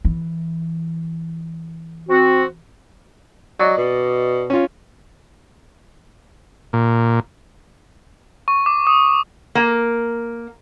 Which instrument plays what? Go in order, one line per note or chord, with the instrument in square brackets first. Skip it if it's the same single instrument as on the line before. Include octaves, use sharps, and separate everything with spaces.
[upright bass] E3
[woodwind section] C4 F#4
[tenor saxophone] F#3 [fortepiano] D5 D#5
[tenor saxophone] B2
[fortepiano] C#4 F4
[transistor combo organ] A#2
[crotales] C#6
D6
D#6
[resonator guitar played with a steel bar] A#3